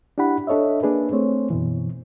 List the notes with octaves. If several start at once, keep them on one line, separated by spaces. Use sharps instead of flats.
D4 E4 G4 F#5 B5
D4 A4 C#5 D#5 E5
A#3 D4 G#4 B4
A3 C4 C5 C#5
F#2 B2 E3